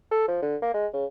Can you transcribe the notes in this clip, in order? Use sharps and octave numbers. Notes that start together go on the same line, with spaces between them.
A4
F3
D3
A#3
G#3
C#3